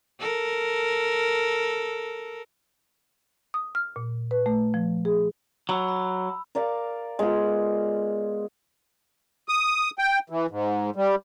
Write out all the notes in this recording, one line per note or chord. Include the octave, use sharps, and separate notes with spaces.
A4 A#4
D#6
F6
A#2
B4
A3
F3
G#4
F#3 B5 E6
B5
A#4 D5 F5 A#5
G#3 B3 F4
D#6
G5
E3
G#2
G3